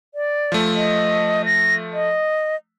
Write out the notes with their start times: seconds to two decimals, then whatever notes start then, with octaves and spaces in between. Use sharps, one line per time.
0.15 D5
0.52 F3 A3
0.75 D#5
1.46 A#6
1.93 D#5